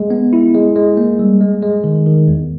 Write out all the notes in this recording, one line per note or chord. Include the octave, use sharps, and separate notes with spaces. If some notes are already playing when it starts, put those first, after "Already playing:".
Already playing: G#3
B3
E4
G#3
G#3
A#3
G3
G#3
G#3
D#3
D#3
E2